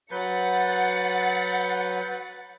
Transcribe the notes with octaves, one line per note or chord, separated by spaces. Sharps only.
F#3 B4 F#5 G6 A6 C#7